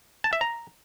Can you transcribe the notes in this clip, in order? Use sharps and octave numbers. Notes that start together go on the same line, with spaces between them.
A5
E5
A#5